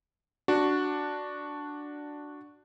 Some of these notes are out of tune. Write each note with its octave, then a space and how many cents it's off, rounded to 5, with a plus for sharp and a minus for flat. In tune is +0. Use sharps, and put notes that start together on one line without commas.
D4 +0 F#4 +0